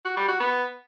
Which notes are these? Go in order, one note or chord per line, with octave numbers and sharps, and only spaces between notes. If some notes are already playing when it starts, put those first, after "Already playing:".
F#4
G3
F#4
B3